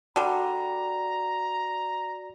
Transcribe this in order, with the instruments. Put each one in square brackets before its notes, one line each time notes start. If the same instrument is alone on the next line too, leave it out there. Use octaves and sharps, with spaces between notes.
[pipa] D3 G3 [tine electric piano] F#4 D5 [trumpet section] A#5